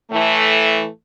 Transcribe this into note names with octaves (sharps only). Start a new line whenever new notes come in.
A2 E3 A3